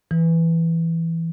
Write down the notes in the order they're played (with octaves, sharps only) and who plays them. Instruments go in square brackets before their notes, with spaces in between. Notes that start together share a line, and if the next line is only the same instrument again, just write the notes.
[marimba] E3